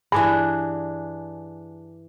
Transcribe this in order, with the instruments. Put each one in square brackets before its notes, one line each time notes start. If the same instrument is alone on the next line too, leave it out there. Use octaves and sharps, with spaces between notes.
[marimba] G2 [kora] E3 D4 G#4